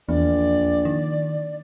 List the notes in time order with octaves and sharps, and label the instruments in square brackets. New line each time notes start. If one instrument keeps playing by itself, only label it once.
[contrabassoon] A#1 [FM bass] E2 [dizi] D5
[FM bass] D#3